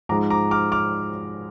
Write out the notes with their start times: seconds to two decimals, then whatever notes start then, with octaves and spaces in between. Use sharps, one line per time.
0.09 G#2 F3 G#3 A#5 D6
0.30 A#5 D6
0.51 D6 F6
0.72 D6 F6